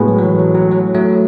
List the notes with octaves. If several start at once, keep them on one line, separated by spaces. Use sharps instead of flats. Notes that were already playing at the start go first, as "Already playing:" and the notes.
Already playing: A2 G#3 B3 F#4
F#3
F#3
E3
F#3
F#3
F#3
F#3 A3